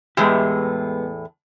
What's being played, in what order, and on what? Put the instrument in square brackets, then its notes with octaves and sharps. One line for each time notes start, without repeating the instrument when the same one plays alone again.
[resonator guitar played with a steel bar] E2 A2 [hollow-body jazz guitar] G#3 B3 G4